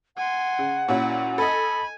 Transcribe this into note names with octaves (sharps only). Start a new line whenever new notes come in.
F#5 G#5 C6
C#3
A#2 C#4 E4 F#4
A4 D#5 G#5 B5